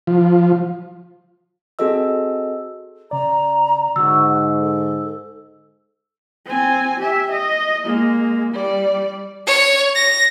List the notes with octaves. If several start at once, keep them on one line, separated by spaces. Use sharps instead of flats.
F3
C4 F#4 G#4 A4 D#5 E6
C#3 D5 A#5
G#2 D3 F#4 E6
A4
C4 G#5
G4 E5
D#5
G#3 A#3
G3 D5
C#5
A#6